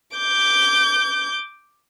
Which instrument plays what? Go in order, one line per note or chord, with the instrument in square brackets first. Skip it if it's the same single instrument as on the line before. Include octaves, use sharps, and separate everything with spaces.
[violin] D6 G6